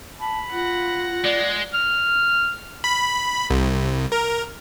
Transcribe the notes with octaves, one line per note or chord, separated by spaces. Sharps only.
A5 B5
F4 F#5 A#6
G#3 D5
F6
B5
C2
A#4